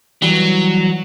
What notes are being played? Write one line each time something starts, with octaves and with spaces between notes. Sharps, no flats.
E3 F#3 G3